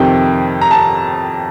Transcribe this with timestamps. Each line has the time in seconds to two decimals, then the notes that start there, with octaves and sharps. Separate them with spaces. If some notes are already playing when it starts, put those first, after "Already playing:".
Already playing: F2 C3 D#3 G5
0.61 A#5
0.71 A5